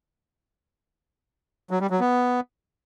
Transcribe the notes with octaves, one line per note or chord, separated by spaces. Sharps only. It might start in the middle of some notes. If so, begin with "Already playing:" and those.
F#3
G3
F#3
B3